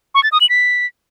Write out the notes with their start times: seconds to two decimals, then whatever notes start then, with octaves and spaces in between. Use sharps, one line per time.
0.15 C#6
0.23 A6
0.32 D#6
0.41 F#7
0.49 B6